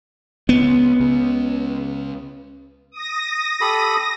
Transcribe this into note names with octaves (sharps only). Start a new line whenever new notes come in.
C#2 B3
C#2 C#3
D#6 A#6
G4 A4 B5